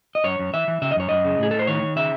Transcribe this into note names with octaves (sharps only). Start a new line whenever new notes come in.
D#5
F#2 C#5
F#2
E3 E5
E3
C#3 E5
D#5
F#2 C#5
F#2 D#5
C#3
A2 G#4
A2 A4
C5
D#3 C#5
D#3
C#3 E5